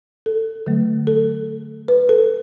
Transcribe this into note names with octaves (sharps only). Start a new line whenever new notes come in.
A4
D3 F#3 A3
A4
B4
A4